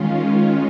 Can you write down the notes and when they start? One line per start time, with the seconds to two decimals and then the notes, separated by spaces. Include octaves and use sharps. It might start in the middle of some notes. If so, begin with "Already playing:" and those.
Already playing: D#3 G#3 C#4 F4